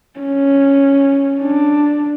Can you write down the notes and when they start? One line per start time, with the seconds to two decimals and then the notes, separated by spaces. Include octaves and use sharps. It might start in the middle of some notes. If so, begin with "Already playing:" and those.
0.20 C#4
1.41 D4